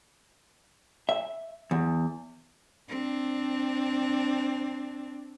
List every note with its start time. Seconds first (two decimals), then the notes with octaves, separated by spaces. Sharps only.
1.09 E5
1.71 E2
2.89 C4 D4